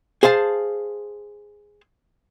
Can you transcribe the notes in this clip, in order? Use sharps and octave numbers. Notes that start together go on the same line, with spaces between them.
G#4 C5 F5 A5